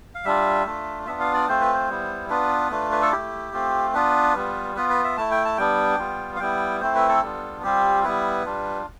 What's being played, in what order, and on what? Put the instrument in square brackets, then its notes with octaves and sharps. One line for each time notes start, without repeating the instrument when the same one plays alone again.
[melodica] F5
G3 D4 F4 E5
A3 D4 F4
B3 D4 F4 E5
F5
D5
A3 C4 F4 C5
B4
C5
G3 B3 E4
B3 D4 F4 B4
A3 D4 F4
B4
A4
A3 E4 G4
A3 C4 F4
B3 D4 F4 B4
G3 B3 F4
B3 F4 B4
B4
E5
A3 E4 A5
G5
A5
G3 B3 D4 G5
G3 B3 F4
F5
G3 B3 E4 G5
A3 C4 E4 C5
B4
A4
G3 B3 D4 F4
G3 C4 F4 G4
G3 B3 E4 B4
G3 D4 F4